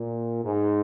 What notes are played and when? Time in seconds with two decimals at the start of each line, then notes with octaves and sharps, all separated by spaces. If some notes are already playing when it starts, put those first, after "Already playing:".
Already playing: A#2
0.44 G#2